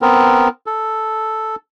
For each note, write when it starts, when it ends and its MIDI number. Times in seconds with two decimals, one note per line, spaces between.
0.02 0.49 59
0.02 0.49 60
0.02 0.49 70
0.66 1.56 69